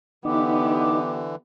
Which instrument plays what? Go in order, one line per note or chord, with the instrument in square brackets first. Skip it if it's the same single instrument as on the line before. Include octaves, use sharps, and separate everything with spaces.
[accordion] D3 E3 [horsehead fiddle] B3 G4 [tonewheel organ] D#4 [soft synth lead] D6